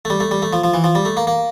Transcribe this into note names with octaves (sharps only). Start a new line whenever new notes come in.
A3
G3
A3
G3
A3
F3
F3
E3
F3
G3
A3
A#3
A#3